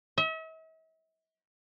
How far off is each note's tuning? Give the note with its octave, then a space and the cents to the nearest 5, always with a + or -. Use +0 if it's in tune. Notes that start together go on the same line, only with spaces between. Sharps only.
E5 -45